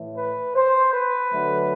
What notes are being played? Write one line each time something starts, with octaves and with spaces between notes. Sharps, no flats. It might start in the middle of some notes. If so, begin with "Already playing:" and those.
Already playing: A2 E3 A3
B4
C5
B4
D3 F#3 A3